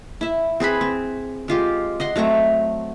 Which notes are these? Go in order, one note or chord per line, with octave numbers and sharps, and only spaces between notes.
E4 E5
C4 G#4 B4 B5
C4
G#3 F4 G4
D#5 F#5 C6
F#3 A3 C4 A#5